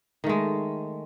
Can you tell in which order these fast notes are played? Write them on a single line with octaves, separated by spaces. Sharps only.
D#3 A3 G#3